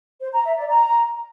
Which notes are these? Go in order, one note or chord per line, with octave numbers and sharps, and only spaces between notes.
C5
A#5
E5
D5
A#5